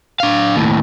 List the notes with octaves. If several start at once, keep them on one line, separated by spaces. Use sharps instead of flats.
D4 F5
D#2 A2